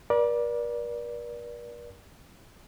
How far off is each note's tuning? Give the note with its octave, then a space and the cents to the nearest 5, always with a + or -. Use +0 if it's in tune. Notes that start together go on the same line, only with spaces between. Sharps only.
A#4 +45 D5 +0